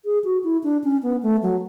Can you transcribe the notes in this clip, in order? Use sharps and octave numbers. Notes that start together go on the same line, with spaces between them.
G#4
F#4
E4
D4
C#4
B3
A3
F#3